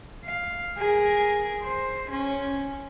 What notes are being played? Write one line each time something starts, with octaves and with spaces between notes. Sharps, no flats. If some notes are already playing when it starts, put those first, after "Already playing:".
F5
G#4 A#4
C5
C#4